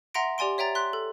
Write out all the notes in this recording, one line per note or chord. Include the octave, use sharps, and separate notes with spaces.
E5 F#5 A#5 C6 A#6 D7
G4 D5 G#5 C6 D7
C#5 E5 G5 A#5 A6
C6 F#6 B6
A4